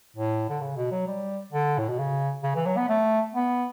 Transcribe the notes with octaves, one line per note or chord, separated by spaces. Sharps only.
A2
D3
C#3
B2
F#3
G3
D3
A2
B2
C#3
C#3
E3
F#3
B3
A3
B3